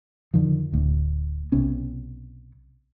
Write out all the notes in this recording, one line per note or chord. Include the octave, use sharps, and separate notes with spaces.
F2 D3 D#3 F3
D1 D2
B1 C3 B3 C#4